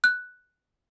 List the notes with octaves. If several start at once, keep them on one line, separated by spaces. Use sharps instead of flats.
F#6